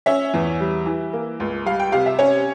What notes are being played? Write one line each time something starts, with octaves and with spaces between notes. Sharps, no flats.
C#4 E5
E2
G3
E3
A#3
C#2
G3 F5
G5
C3 F5
E5
C#4 C#5